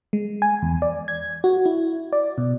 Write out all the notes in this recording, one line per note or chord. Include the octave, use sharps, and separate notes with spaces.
G#3
G#5
E2
D5
G#6
F#4
E4
D5
B2